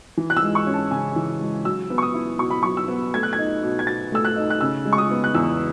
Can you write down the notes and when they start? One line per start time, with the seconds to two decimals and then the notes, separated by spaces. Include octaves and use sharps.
0.17 E3
0.30 F#6
0.37 E6
0.42 G#3
0.55 C#6
0.67 C#4
0.74 A5
0.91 C#3 G#5
1.16 E3
1.40 G#3
1.65 F#3 E6
1.90 B3
1.98 C#6
2.02 D#6
2.14 E4
2.39 B2 C#6
2.50 B5
2.63 F#3 C#6
2.77 E6
2.88 B3
3.14 A3 G#6
3.23 F#6
3.33 G#6
3.39 D#4
3.63 B2
3.79 G#6
3.87 B2 A6
4.12 A3 E6
4.25 F#6
4.36 D#4
4.50 F#6
4.61 C#3 E6
4.85 G#3
4.93 C#6
4.98 D#6
5.11 B3
5.24 F#6
5.35 E2 E6